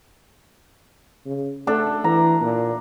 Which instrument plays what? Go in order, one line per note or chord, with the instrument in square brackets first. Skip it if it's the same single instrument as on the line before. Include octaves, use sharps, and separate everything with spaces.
[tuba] C#3
[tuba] A3 [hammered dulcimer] D4 A4
[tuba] E3 [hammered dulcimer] A#5
[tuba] A#2